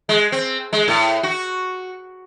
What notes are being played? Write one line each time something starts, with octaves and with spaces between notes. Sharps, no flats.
G#3
C4
G#3
A2
F#4